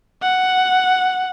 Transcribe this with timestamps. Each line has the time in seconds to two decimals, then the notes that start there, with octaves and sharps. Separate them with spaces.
0.22 F#5